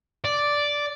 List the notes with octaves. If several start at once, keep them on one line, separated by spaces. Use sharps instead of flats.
D5